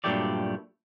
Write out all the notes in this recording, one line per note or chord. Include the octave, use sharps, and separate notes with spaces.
G2 A#2 F#3 A3 G4 D5